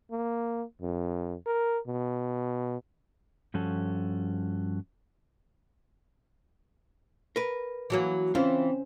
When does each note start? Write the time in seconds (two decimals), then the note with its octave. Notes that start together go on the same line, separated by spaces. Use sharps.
0.11 A#3
0.82 F2
1.46 A#4
1.87 B2
3.54 G2 F3 C#4 F#4 A4
7.36 A#4 B4
7.90 E3 F#3 A#3
8.35 E3 C4 C#4 F4 C5